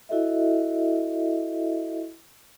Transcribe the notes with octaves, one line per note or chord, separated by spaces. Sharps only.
E4 F#4 A4 D#5 E5